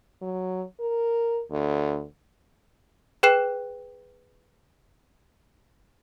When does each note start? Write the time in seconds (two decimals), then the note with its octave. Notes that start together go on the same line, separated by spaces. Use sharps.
0.22 F#3
0.80 A#4
1.51 D2
3.23 G#4 B4 G5 F#6 C7 E7